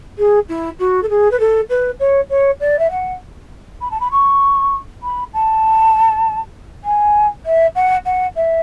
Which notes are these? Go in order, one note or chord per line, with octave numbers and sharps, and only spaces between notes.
G#4
E4
F#4
A4
G#4
B4
A4
B4
C#5
C#5
D5
E5
F#5
B5
A5
B5
C#6
B5
A5
G#5
E5
F#5
F#5
E5